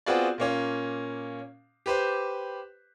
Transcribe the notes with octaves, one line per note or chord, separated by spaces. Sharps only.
B3 C4 F4 F#4 G#4 D5
A#2 A#3 C#4
G4 B4 C5